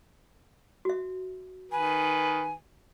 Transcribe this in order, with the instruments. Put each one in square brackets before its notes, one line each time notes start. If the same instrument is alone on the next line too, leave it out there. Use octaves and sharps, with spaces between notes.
[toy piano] F#4 E5
[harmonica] D#3 B4 [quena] G#5